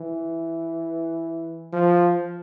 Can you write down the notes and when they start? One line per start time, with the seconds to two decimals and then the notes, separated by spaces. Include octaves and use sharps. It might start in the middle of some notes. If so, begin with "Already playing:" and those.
Already playing: E3
1.73 F3